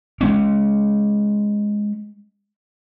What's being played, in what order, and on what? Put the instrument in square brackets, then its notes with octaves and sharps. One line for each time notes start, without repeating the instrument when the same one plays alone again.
[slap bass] G#3 A#3 C#4